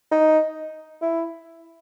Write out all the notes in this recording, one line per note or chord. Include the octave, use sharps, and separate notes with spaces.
D#4
E4